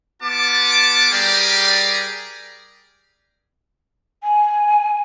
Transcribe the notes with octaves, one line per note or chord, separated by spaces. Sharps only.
B3 F4 A5 D6
G3 G4 G#4 A#4 D5
G#5